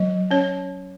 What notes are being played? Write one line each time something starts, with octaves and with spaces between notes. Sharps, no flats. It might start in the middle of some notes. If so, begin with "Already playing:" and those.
Already playing: F#3 D#5
C#4 C#5